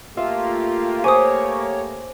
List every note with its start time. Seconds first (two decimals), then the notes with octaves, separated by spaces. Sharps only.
0.17 A3 A#3 F4 G4 E5
1.04 C5 C#5 G#5 D6 D#6